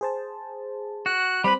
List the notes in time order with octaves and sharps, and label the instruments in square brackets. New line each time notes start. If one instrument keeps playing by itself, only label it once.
[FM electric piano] G#4 C5 A5
[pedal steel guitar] F#4 [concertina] F#6
[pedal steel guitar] G3 B4 [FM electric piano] C4 C5 [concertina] B5